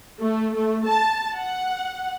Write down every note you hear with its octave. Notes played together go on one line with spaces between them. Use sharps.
A3
A3
A5
F#5